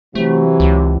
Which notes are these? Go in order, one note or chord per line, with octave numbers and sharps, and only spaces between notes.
C3 E3 F#3 A3
C#2